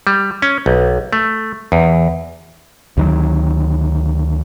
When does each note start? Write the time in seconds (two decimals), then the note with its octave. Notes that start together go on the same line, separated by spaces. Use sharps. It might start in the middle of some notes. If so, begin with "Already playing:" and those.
0.07 G3
0.42 C#4
0.66 B1
1.13 A3
1.72 E2
2.97 D2 D#3 F#3